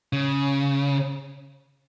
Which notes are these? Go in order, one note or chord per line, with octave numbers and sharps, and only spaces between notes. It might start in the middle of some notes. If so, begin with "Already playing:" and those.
C#3